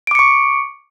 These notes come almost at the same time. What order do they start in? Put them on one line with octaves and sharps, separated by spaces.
D7 D6 C#7 C#6